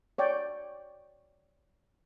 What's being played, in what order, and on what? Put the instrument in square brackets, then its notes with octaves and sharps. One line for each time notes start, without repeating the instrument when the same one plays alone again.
[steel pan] C#5 D5 G5